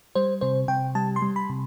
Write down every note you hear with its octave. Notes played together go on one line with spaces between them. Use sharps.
G3 C5
C3 C5
C3 G5
G3 A5
C6
G3
B5
C3